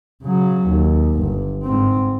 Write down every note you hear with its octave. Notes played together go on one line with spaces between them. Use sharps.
C#3 F#3
D#2
G1
G#2 C4